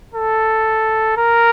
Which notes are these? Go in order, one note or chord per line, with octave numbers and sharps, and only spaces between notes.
A4
A#4